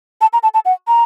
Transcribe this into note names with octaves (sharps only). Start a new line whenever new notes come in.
A5
A#5
A5
A5
F#5
A#5